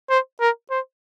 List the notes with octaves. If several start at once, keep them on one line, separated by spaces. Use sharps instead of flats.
C5
A#4
C5